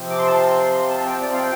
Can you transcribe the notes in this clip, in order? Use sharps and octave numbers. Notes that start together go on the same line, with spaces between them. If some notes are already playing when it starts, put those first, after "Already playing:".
Already playing: C3 F3 C4
D6
C6
A5
C6
C6
A5
G5
D5
F5
G5